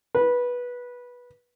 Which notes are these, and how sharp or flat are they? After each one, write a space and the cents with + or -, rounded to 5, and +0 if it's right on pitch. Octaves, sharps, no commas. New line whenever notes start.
B4 -15